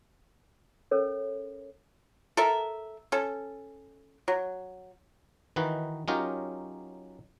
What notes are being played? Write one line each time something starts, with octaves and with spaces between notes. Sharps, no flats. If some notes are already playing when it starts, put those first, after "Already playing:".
C#4 A4 A#4 C#5
A4 A#4 E5
C#4 A4
F#3
D#3 E3 D#4 F#4 B4
F#3 C#4 D#4 F4 G4 A#4